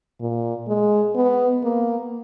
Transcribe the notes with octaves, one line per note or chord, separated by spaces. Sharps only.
A#2
G#3
B3
A#3